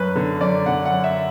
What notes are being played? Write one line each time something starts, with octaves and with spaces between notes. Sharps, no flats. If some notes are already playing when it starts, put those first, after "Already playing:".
Already playing: F#2 B4
D3
F#2 D5
D3 F#5
F#5
F#2
E5